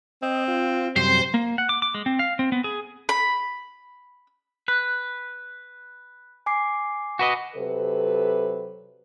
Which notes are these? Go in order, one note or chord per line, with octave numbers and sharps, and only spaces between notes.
C4 D#5
F4
F#2 C3 G3 C5
A#3
F#5
D6
D6
G#3
C4
F5
C4
B3
G#4
B5
B4 F#6
G#5 D6 C7
F#4 B4 D#5
C3 F#3 A4 B4